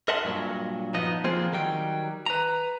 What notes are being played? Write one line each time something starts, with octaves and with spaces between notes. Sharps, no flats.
A#4 D#5 E5 F#5 A5 C6
G2 A#2 F#3
F3 B3 D#4 D#5
F3 A#3 C4 D4 F4 G#4
D#3 F#3 G3 G5
B4 A#5